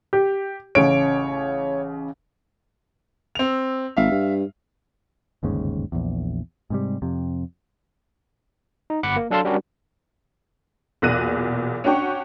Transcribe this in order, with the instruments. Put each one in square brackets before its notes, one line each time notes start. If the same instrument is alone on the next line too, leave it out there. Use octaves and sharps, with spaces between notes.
[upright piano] G4
[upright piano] A1 C#3 D7 [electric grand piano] C#5
[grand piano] C4 F7
[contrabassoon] G#1 [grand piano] E5 F5
[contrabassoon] G2
[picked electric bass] G1 D#2 G#2 C#3
A#1 E2
G#2 C3 G3
F2 C3
[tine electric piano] D#4
G1 F#5 B5 D6 C#7
A#3
F#3 D4 A4 F5 A5 C6
G3 C#4 D4 F#4 G4 A#4
[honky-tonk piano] B1 E2 A#2 F#6 A#6 D#7
C#4 D4 F#4 G5 C#6